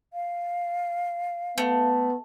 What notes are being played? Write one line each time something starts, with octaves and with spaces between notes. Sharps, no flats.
F5
A3 B3